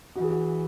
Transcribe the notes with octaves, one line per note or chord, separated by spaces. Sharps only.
E3 F#4
G#4
F#4